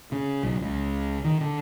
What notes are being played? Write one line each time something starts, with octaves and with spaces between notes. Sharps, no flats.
C#3
B1
C#2
D#3
D3